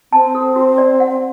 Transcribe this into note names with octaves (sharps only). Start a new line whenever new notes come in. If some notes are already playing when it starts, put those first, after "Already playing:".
C4 A5
A4
F#4
D5
F#5